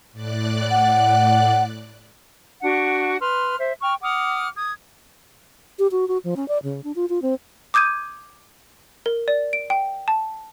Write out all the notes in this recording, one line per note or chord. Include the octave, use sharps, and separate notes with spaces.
A2 D5 F#6
F#5
D4 F#4 F#5 C#6
B4 C6 F6
C5 E5
G5 C#6 F6
F#5 D6 D#6 F6
D#6 G#6
G4
F#4
F#4
F3
C#4
D5
C#3
D4
F4
F4
C4
D6 D#6 G6 G#6 D#7
A#4
D5
D7
G5
A5